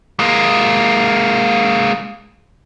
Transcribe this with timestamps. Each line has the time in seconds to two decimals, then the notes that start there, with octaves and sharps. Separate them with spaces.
0.19 G#3 A#3